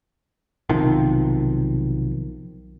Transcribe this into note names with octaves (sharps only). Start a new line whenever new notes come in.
B1 C3 D#3 F3